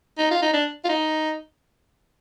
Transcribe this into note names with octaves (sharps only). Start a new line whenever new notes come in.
D#4
F4
D#4
D4
F4
D#4